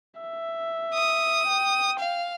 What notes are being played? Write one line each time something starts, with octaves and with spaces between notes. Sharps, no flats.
E5
D#6
G5
F5